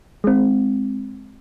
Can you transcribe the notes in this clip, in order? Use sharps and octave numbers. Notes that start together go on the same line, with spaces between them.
G#3 C4